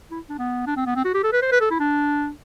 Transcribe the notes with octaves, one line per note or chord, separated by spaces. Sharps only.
E4
D4
B3
D4
C4
B3
C4
F#4
G4
A4
B4
C5
B4
A4
E4
D4